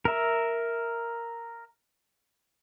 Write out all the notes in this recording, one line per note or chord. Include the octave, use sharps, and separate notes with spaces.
A#4 E5